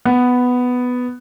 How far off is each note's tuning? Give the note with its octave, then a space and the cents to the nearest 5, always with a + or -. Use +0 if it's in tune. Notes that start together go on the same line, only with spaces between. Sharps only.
B3 +5